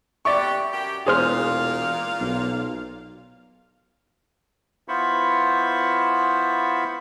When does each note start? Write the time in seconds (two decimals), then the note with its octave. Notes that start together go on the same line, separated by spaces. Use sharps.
0.25 B3 G4 D5 E5 C#6
0.72 F#2 G4
1.06 E1 A#2 G#4 C5 F5 F6
2.20 B1
4.88 B3 E4 F4 C5 B5 C#6